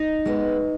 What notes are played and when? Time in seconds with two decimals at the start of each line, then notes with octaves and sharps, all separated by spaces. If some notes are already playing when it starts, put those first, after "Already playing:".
Already playing: D#4 D#5
0.25 G#3 B3